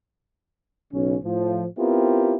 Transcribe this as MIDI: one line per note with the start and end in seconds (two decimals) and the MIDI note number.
0.92 1.16 35
0.92 1.16 49
0.92 1.16 61
1.23 1.66 45
1.23 1.66 53
1.78 2.36 59
1.78 2.36 60
1.78 2.36 64
1.78 2.36 65
1.78 2.36 67
1.78 2.36 70